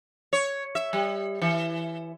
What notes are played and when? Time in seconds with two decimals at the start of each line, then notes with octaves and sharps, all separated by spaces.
0.33 C#5
0.75 E5
0.93 G3
1.42 E3